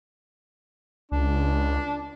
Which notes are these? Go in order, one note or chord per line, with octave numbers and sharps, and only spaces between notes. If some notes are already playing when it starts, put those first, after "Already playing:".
C#2 D4